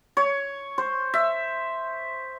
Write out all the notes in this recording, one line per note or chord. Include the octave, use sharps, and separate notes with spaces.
C#5
C5
E5